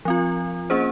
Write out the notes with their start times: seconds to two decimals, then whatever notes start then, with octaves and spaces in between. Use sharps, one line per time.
0.05 F3 C4 F4
0.70 A#3 C#4 G#4 C5